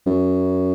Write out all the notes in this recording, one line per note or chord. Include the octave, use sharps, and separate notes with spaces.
F#2